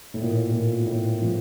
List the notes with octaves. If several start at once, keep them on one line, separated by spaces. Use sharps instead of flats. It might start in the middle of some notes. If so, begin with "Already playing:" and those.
A2
A#2
A2
A#2
A2
F3